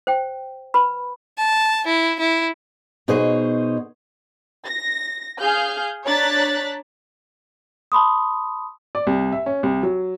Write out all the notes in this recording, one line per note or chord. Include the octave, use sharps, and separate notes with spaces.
C5 G5
B4 B5
A5
E4
E4
B2 D#4 G#4 C5 C#5 D#5
A#6
G#4 F5 F6 G6
D4 C#5 A#5 F#6 A6 B6
A5 B5 C6 D#6
D5
C2
E5
C#4
C2
F#3